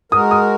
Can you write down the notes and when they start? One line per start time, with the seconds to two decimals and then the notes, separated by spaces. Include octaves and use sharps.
0.12 G#3 F#4 A#4 D#6
0.31 D#6